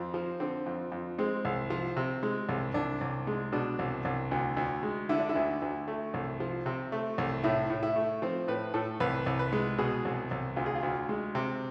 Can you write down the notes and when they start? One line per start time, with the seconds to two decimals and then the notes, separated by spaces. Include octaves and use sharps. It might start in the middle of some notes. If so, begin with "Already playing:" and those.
Already playing: F2 C4
0.14 F3
0.40 D3 C4
0.66 F2
0.92 F2
1.18 G#3 C4
1.45 C2
1.70 F3
1.97 C3
2.23 G#3
2.49 C2
2.74 C2 D4
3.01 C2
3.27 G#3
3.52 B2 D4
3.79 C2
4.05 C2
4.31 D2
4.57 D2
4.83 G#3
5.09 D3 E4
5.20 D4
5.29 E4
5.35 D2
5.62 D2
5.88 A3
6.14 C2
6.40 F3
6.66 C3
6.92 A3
7.18 C2
7.44 A2 E4
7.70 A2
7.83 E4
7.96 A3
8.22 F3 C4
8.48 A2 B4
8.74 A2 A4
9.00 C2 B4
9.26 C2
9.39 B4
9.53 G#3
9.78 B2 G#4
10.05 C2
10.31 C2
10.56 D2 F4
10.66 G#4
10.75 F4
10.83 D2
11.09 G#3
11.35 C3